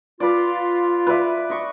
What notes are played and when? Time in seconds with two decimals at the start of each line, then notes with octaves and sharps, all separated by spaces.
0.20 F4 B4 D5
1.07 B4 D5 E5
1.50 D#5 C#6